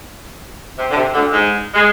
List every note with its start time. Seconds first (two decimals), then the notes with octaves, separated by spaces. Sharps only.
0.78 C3
0.90 D3
0.96 C3
1.13 D2 D3
1.32 G#2 G#3
1.74 G#3